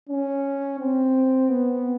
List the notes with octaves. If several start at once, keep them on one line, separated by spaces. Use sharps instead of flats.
C#4
C4
B3